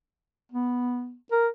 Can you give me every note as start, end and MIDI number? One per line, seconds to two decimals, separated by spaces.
0.52 1.15 59
1.32 1.48 70